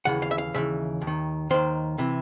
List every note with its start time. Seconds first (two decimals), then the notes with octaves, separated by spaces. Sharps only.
0.05 D#2 C#3 E3 F#5
0.22 F5
0.31 E5
0.38 F5
0.54 D#2 C#3 E3 E5
1.01 D#2
1.07 D#3
1.50 D#2 D#3 C5
1.98 C3 E3